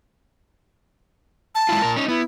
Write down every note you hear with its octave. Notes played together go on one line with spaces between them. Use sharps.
A5
G#3 E4 F4
A#2 A#4
C#4 D#4
B3 E4